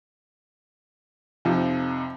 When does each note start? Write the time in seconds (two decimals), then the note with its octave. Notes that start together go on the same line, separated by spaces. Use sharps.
1.45 F2 C3 F3 D#4